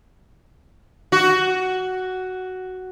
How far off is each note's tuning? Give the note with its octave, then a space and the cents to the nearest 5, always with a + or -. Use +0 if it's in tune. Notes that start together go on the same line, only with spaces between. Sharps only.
F#4 +5